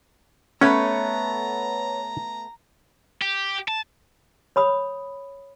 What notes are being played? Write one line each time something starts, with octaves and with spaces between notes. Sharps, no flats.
A3 B3 C#4 B4 C#5 F#5 A#5
G4
A5
C#5 B5 D#6